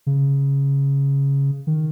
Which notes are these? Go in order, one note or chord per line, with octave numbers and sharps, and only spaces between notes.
C#3
D#3